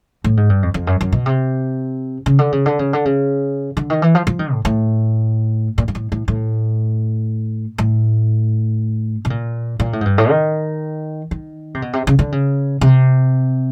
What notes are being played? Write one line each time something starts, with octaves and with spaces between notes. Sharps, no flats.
A2
G#2
G2
F2
F2
F#2
F#2
B2
C3
C#3
D3
C#3
D3
C#3
D3
C#3
D3
D#3
E3
F3
F3
D#3
A2
A2
A#2
G#2
A2
A2
A2
A2
B2
A#2
A#2
A2
G#2
G2
A2
D#3
D#3
C3
B2
C3
C#3
D3
C#3
C3